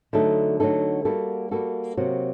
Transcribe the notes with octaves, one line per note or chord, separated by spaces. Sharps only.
D3 F#3 A3 D#4 A4
D3 F#3 A3 D#4 A4
G3 A#3 F#4 A4
G3 A#3 F#4 A4
C3 F#3 A#3 F#4